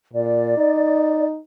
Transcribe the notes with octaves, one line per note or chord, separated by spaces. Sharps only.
A#2 D5
D#4